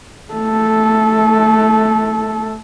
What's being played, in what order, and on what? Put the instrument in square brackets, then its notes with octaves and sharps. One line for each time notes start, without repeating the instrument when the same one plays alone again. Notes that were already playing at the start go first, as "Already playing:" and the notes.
[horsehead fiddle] A3 A4